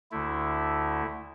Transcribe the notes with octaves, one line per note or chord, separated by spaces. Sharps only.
D2 D3 A3 E4